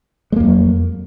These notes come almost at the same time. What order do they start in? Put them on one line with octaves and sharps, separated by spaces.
G#3 A#3 F2 F#3